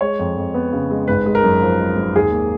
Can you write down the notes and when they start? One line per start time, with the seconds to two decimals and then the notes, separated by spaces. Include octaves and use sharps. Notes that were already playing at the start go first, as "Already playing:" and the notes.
0.01 G#3 C#5
0.19 F2
0.37 F2
0.54 B3
0.73 C#3
0.91 G#3
1.08 G#1 B4
1.26 G#3
1.35 A#4
1.43 F#2
1.62 F3
1.79 G#3
1.97 G#1
2.16 D#2 G#4
2.32 A#3